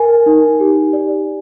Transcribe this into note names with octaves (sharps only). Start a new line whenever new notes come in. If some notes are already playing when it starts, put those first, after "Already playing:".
Already playing: A#4 G#5
D#4
G4
D5